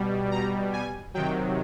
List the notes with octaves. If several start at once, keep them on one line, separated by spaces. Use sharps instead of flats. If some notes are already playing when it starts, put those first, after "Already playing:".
Already playing: B2 G3
A#5
G#5
C3 D#3 F#3 G5